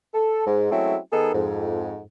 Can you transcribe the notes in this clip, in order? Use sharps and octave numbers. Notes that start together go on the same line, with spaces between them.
A4
G#2
F#3 G#3 A3 C4 C#4 E4
D#3 B3 D#4 G#4 A4
F2 G#2